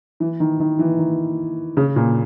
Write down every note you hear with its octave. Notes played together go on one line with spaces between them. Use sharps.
E3
D#3
D#3
E3
D#3
C#3
A#2